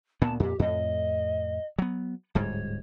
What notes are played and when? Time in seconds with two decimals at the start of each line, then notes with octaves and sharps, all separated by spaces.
0.22 D2 A#2 B3 A5
0.40 F2 A#2 G4
0.59 F2 A2 D#5
1.79 F#3 B3
2.35 D1 G#2 G3 C#5